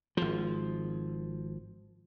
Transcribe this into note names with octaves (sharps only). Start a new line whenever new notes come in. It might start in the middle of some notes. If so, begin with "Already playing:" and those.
G#1 F3